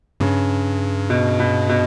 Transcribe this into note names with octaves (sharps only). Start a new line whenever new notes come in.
G2 C#3
B2
B2
B2